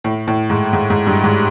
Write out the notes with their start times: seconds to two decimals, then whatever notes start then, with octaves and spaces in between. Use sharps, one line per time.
0.04 A2
0.27 A2
0.50 G#2
0.73 G#2
0.90 G#2
1.07 G2
1.24 G#2